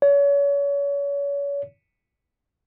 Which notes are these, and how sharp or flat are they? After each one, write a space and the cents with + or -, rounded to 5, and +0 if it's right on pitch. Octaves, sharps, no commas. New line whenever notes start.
C#5 +35